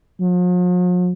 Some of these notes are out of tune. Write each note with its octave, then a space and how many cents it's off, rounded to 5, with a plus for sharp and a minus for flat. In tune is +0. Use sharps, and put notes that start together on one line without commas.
F3 +45